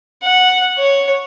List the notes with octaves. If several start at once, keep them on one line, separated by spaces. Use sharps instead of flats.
F#5
C#5